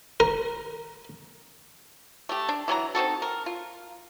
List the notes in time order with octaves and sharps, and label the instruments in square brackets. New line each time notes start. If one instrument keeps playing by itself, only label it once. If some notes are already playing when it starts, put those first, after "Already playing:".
[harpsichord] A#4
[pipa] A3 G4
D4
E3 F#3 G#5 A#5
C4 D#4 F#4 A4
A#4
F4